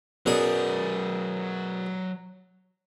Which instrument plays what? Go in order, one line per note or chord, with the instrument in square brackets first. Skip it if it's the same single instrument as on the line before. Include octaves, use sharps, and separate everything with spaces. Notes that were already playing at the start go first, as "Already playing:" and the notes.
[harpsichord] F#2 B2 G#4 [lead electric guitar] F#3 D5